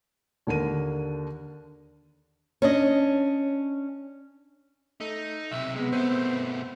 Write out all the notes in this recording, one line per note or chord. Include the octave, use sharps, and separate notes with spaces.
D#2 D3 A#4 D#7
C#4 D4 D#5
A3 D#4
B1 C3 E5
G#3 B3
B2 A3 C4